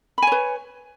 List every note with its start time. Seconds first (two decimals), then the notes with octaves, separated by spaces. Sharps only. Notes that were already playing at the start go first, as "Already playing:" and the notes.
0.18 B5
0.22 G#5
0.27 C#5
0.32 B4